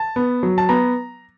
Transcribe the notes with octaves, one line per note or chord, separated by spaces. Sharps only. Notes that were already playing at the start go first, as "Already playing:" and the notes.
Already playing: A5
B3
F#3
A5
B3 A#5